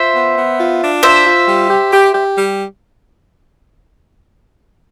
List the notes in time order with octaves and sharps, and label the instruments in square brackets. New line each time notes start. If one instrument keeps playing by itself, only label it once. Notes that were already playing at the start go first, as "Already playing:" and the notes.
Already playing: [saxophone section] F4 [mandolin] C5 E5
[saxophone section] B3
B3
F4
D4
[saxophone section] F4 [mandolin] C5 E5
[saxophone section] F4
G3
G4
G4
G4
G3